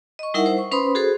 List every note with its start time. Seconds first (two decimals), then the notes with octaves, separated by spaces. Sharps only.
0.19 D#5 C#6
0.34 G3 D#4 E4 A#4 E5 F#5
0.46 C5
0.58 C#6
0.71 C#4 B4 C5 B5 C6 D#6
0.95 F#4 G#4 A4 C5